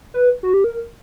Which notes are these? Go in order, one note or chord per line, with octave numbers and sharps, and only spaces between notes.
B4
F#4
G4
A#4